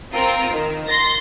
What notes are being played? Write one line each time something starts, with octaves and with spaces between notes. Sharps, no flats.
C4 F4 A#4
D#3
C6 A6 A#6